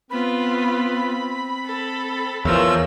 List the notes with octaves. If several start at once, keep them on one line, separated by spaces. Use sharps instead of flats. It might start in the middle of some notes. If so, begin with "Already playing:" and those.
B3 C4 F4 B5
A4
E2 E3 F3 G#4 A#4 C#5 E6